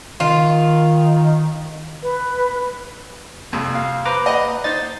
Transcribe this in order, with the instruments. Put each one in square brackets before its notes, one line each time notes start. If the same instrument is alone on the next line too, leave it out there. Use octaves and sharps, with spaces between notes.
[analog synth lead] D#3 [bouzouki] F4
[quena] B4
[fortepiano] C2 F2
[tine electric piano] F5
[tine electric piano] B4 A#5 D6 [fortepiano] C5
[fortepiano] D#5 F#5
[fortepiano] D#4 C5 [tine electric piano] A6